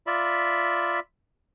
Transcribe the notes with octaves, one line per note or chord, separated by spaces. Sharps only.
F4 D5 E5 B5